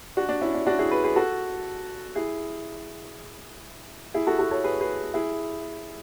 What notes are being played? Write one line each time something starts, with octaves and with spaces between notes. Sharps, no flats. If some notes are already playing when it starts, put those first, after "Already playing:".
D4 F#4
D4
C#4 E4
D4
D4 F#4
E4 G#4
G#4 B4
G#4 B4
F#4 A4
E4 G#4
E4 G#4
F#4 A4
F#4 A4
A4 C#5
G#4 B4
G#4 B4
E4 G#4